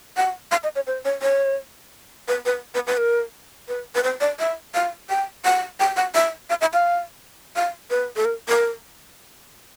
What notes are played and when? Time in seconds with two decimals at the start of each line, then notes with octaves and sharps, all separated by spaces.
0.17 F#5
0.52 F5
0.63 D#5
0.75 C#5
0.87 C5
1.05 C#5
1.22 C#5
2.28 B4
2.46 B4
2.74 B4
2.87 B4
2.97 A#4
3.68 B4
3.95 B4
4.03 C5
4.21 D5
4.39 E5
4.74 F5
5.09 G5
5.45 F#5
5.80 G5
5.97 F#5
6.15 E5
6.50 F5
6.61 E5
6.73 F5
7.56 F5
7.90 B4
8.16 A4
8.25 A#4
8.49 A#4